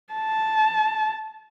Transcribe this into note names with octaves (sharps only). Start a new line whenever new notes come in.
A5